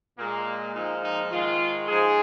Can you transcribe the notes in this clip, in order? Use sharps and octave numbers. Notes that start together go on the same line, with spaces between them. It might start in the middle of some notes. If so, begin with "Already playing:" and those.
A#2 G#3 A#3
A#2 F3 G#3 D#4
D#4
G#2 D#3 G#3 F4
G#2 F3 G#3 G#4